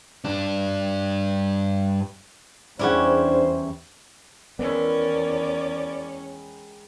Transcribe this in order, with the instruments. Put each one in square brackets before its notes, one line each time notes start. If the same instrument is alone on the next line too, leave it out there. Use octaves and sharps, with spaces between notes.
[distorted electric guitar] G2 D4
[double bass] E2 [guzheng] G3 C#4 E4 [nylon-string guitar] D4 G#4 F#5 [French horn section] C5
[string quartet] E2 C#4 [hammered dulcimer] D#3 G#3 E4 [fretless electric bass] B3 [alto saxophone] D5